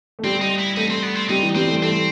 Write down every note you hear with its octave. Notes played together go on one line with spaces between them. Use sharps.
A3
G3 C4
D#4
E4
A3 D#4
C4
B3
C4
G3 D#4
E3
G3 C4
A3
A3 C4